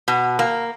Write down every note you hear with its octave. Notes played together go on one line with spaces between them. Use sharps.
B2
A#3